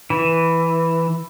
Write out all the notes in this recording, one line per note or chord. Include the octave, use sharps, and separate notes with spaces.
E3